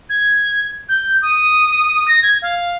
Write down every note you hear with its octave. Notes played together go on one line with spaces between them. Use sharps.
G#6
G6
D#6
A#6
G#6
F5